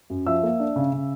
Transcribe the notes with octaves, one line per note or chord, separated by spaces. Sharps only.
F#2
F3 E5 E6
A#3
D4
C#3
C#3